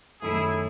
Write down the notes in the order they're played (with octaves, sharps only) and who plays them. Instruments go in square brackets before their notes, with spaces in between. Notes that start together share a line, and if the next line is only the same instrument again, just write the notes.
[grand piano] F#2 D#3 A3 D#4 A4 [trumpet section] E4 G#4